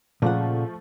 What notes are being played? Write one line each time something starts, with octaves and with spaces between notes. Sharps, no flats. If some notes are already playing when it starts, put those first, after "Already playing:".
A#2 C#3 F3 A3 F#5